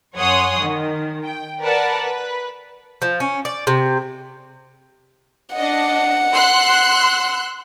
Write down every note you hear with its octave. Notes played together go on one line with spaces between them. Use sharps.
F#2 C#5 F#5 G#5 C6 D#6
D#3
G5
A#4 B4 D5 F#5 A5
B4
F3
C#4
D5
C3
D4 D#5 F#5
C6 E6 F#6